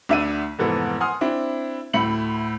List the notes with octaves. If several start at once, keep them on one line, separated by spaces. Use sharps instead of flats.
D2 D4 E5 F#5 D#7
F1 G#2 E3 B3 A4
F#5 G#5 C6 D#6 F6
C4 D4 E4
D2 A2 E5 B5 C#7 F#7